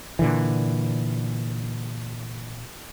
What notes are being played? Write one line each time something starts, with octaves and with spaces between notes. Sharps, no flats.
A#2 D3 E3